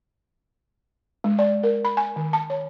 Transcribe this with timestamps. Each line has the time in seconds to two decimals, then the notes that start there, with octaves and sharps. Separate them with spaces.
1.24 G#3
1.39 D5
1.63 A#4
1.85 B5
1.97 G#5
2.16 D#3
2.33 A5
2.50 C#5